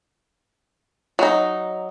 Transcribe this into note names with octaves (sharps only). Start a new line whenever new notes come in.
F#3 D#4